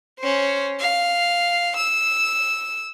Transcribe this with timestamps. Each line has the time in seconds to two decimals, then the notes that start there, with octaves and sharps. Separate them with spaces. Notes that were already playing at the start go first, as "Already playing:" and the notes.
0.19 C#4 C5
0.80 F5
1.77 E6